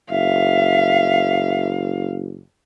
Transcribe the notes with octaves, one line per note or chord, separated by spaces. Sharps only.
F#1 E5 F5